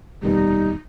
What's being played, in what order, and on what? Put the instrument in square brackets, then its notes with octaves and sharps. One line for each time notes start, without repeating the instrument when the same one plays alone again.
[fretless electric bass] F1 D#2 B2 [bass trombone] G3 [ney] D#4